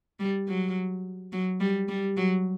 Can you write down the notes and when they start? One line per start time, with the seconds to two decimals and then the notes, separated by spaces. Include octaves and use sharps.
0.20 G3
0.48 F#3
1.33 F#3
1.61 G3
1.89 G3
2.17 F#3